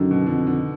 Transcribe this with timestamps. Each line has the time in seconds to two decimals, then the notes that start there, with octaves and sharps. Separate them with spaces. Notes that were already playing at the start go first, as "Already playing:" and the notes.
Already playing: F#2 D3 D#3
0.11 B2
0.26 F2 D3
0.47 D3